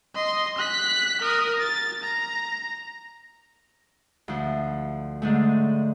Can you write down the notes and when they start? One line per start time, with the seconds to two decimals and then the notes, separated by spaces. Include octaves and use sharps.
0.15 D#5 C6
0.58 F#6 B6
1.21 A#4 D#6
1.60 A6
2.03 A#5
4.28 D2 F3
5.22 G#2 D3 A3